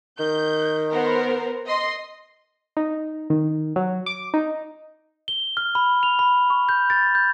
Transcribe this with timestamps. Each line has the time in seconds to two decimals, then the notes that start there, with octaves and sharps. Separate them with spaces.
0.20 D#3 G6
0.93 B3 A#4 C5
1.66 D#5 C6
2.77 D#4
3.30 D#3
3.76 F#3
4.06 D6
4.34 D#4
5.28 G7
5.57 F6
5.75 B5
6.03 F7
6.19 B5
6.50 C#6
6.69 G6
6.90 A6
7.15 G6